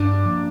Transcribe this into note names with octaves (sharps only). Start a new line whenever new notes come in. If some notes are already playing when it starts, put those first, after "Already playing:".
Already playing: G2 D4
F3 A#3